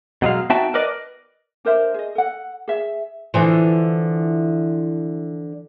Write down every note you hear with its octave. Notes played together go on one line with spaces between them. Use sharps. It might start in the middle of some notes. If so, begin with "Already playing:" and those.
B2 F#3 G#3 F5
B3 D#4 F#4 E5 G5 A5
A#4 B4 D5 D#5
D4 A#4 C5 E5
G#4 D#5
A4 F#5
G#4 E5
D3 E3 F3